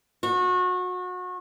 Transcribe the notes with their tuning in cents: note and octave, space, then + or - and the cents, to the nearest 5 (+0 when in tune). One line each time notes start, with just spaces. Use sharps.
F#4 -30